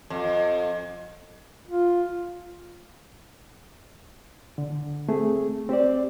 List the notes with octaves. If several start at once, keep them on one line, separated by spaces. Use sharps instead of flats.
F2
F4
D3
A3 C4 G#4
C4 G4 C5 D5